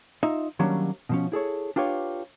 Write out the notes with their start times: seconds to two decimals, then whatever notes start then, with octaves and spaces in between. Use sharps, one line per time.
0.23 D#4 F4 D#5 E5
0.59 D#3 F#3 G3 A#3 C#4 D4
1.09 B2 F3 C#4
1.32 E4 G#4 A4 C#5
1.76 D4 F4 G4 B4 C#5